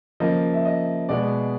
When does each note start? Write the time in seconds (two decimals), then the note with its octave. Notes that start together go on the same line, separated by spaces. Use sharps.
0.20 C#3 F3 A#3 D#5
0.53 E5
0.65 D#5
1.09 B2 G#3 B3 D5